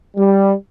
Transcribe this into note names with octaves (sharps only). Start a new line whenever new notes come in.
G3